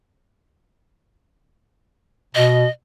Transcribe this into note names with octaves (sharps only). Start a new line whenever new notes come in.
B2 D#5